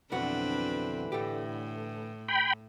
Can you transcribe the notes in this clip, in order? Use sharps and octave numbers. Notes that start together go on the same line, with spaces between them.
B1 F2 D3 E3 C4 D4 F#4 B4
A2 A3 G4
G5 B5